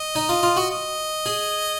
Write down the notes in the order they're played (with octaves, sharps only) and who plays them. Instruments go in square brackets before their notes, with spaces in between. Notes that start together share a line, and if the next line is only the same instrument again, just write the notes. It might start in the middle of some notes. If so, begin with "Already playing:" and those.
Already playing: [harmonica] D#5
[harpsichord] D#4
F4
F4
F#4
[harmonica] D#5
[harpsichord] G#4